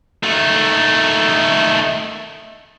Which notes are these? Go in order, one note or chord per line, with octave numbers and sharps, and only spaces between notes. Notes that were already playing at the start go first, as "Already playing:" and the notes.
D#3 A3